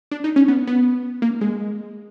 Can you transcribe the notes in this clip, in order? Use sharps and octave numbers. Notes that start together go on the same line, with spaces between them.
D4
D#4
C#4
B3
B3
A#3
G#3